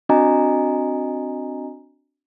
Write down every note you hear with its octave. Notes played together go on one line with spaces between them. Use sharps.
C4 D4 F#4 D#5 G#5 A#5